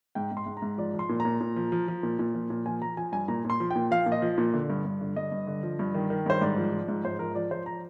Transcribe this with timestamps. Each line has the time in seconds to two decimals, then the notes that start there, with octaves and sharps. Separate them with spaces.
0.15 G#2 G5
0.32 G#2
0.37 C6
0.46 G#2
0.57 A#5
0.62 G#2
0.78 F3 D5
0.94 F3
0.99 C6
1.09 A#2
1.20 A#5
1.25 A#2
1.41 A#2
1.56 F3
1.72 F3
1.88 F3
2.03 A#2
2.19 A#2
2.35 F3
2.50 A#2
2.66 F3 G#5
2.82 F3 A#5
2.97 F3 G#5
3.12 G2 G#5
3.28 A#2 A#5
3.45 A#2 C6
3.60 F3
3.71 A#2 G5
3.91 F3 F5
4.06 A#2
4.12 D#5
4.22 F3
4.38 A#2
4.54 D3
4.70 G2
4.85 G2
5.01 D3
5.16 G2 D#5
5.32 G2
5.47 D3
5.63 F3
5.79 G2
5.94 D#3
6.10 D#3
6.26 G2 C5
6.41 G#2 D5
6.57 F3
6.73 F3
6.88 G#2
7.04 G#2 C5
7.19 F3 A#4
7.35 F3 D5
7.51 F3 C5
7.66 A#5